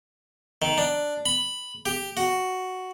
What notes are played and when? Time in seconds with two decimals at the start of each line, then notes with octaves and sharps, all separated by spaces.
0.62 D#3
0.78 D4
1.26 B5
1.86 G4
2.17 F#4